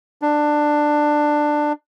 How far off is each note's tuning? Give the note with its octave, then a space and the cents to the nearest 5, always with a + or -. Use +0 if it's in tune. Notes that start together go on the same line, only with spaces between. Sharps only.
D4 +15